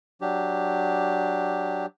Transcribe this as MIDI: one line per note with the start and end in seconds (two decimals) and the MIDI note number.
0.21 1.86 54
0.21 1.86 62
0.21 1.86 67